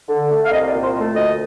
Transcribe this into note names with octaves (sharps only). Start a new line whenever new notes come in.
D3
A3
F5
C2 D#5
D5
A#2
C5
A3 A4
D2 D#5